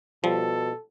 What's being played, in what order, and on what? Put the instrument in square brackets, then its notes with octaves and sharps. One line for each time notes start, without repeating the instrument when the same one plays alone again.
[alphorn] B2 [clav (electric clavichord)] F3 G3 [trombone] A4